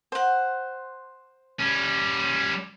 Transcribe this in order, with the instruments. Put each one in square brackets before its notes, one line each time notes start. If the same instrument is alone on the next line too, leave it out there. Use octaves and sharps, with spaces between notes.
[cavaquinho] C5 F#5
[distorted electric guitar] G3 C#4